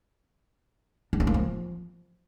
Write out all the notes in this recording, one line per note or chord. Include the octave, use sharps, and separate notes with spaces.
D4
C#4
A#3
F3